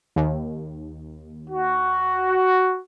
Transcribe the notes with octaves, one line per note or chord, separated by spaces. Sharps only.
D#2
F#4